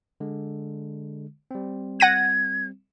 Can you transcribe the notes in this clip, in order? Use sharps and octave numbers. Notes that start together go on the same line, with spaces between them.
D3 G#3
G3 C4
F#5 G#6 A#6 D#7